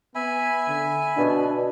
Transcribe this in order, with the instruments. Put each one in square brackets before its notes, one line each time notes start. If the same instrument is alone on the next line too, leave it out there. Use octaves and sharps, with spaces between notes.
[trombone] B3 [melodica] E5 G#5 B5
[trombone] D3
[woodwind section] B2 [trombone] D4